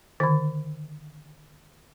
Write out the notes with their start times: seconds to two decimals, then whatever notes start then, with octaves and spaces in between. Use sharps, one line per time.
0.20 D3 D#3